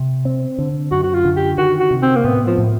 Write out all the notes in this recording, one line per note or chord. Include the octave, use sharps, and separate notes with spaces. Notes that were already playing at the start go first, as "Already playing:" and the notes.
Already playing: C3
C4
D3
F#2 F#4
F#4
F4
D3
G4
D#3 F#4
F#4
C3
C4
A#3
A2 B3
F3
A2